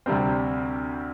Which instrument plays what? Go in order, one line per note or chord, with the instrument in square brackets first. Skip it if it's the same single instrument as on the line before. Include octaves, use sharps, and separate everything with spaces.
[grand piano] D2 C3 G3 C4